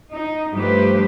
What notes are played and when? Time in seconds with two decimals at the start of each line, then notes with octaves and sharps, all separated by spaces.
0.13 D#4
0.55 G2 F3 A3 G4 B4 C5